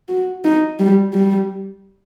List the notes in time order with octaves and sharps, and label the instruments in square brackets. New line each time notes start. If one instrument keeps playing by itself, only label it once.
[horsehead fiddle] F#4
D#4
G3
G3